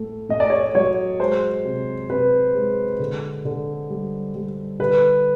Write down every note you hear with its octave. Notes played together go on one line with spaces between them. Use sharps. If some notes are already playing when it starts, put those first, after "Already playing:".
Already playing: A2 A3
A2 D#5
D5
C#5
D5
F#3 C#5
G#3 C5
C3
C3 B4
G#3
D3
D3
G3
G3
D3 B4